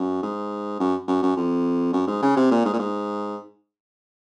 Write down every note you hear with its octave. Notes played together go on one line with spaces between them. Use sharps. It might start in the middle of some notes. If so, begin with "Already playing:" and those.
Already playing: F#2
G#2
F#2
F#2
F#2
F2
F#2
G#2
C#3
C3
A#2
G#2
A#2
G#2